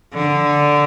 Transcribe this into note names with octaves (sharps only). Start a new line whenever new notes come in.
D3